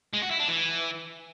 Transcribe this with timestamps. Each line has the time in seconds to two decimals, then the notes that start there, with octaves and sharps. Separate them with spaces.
0.13 G#3
0.22 F#4
0.31 E4
0.39 D4
0.48 E3